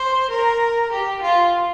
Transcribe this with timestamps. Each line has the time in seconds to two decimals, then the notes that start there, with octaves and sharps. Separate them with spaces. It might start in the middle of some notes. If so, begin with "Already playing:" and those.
Already playing: C5
0.30 A#4
0.92 G4
1.22 F4